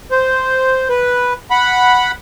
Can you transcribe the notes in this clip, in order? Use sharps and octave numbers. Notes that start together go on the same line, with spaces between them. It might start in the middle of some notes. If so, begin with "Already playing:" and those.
C5
B4
F#5 B5